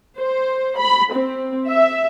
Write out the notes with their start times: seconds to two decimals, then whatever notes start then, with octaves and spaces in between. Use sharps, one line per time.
0.18 C5
0.78 B5
1.12 C4
1.68 E5